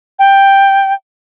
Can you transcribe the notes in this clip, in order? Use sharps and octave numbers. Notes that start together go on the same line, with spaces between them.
G5